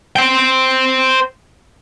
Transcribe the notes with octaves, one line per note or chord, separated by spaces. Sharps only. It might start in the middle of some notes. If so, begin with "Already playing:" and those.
C5 G5